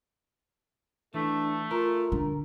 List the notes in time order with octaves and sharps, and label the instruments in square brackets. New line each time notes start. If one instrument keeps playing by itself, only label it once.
[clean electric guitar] E3 [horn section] A3 [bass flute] D4
[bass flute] F4 [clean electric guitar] A#4
[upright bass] D3